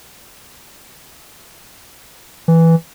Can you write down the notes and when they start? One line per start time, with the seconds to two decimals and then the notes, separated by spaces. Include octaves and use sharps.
2.48 E3